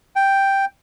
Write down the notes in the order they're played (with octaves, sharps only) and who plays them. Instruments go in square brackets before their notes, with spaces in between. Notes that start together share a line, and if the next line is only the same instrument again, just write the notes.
[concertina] G5